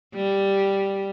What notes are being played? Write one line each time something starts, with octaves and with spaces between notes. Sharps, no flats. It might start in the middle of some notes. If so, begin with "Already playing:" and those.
G3